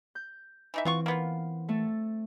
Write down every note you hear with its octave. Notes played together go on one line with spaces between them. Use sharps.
G6
E3 D#4 E5
E3 B3 C4 F4 C#6
A#3 B3 F4
A3 A4